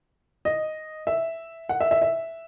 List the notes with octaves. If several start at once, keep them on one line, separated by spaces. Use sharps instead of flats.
D#5
E5
F#5
E5
E5
E5